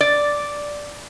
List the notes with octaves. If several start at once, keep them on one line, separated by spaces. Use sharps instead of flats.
D5